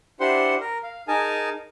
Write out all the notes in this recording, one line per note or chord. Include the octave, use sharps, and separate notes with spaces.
D4 E4 G4 C5 F#5 C6
A#4
F5
D#4 G#4 A#4 G#5 A5